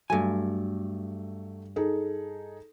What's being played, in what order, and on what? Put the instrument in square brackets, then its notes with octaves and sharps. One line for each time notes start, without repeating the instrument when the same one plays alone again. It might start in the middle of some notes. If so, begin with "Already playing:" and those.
[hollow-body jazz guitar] G2 G#5 [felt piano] F#3 A3
[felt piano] D#4 G#4 A4